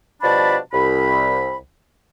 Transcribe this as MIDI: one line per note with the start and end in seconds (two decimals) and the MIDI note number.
0.22 0.57 47
0.22 0.57 53
0.22 0.57 55
0.22 0.57 62
0.22 0.57 81
0.22 0.57 83
0.73 1.58 36
0.73 1.58 83